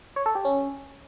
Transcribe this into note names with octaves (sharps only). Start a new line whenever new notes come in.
C#5
A4
G4
C#4